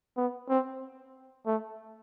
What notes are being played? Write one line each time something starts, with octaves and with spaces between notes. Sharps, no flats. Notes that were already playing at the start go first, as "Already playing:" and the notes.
B3
C4
A3